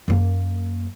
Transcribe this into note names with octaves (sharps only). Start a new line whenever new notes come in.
F#2 A#3